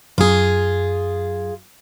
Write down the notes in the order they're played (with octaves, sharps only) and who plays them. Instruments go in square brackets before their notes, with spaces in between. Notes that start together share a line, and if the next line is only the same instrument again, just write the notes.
[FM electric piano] F#2 [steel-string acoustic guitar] F4 G#4